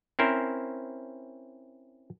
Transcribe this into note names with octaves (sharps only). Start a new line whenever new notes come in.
C4 C#4 E4 A#4 C5